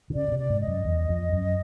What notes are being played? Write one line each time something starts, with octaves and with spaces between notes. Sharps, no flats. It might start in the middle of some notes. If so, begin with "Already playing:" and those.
D3
C#3 D5
B2
C3
D5
G#2
D#5
F#2
E2
F2
F#2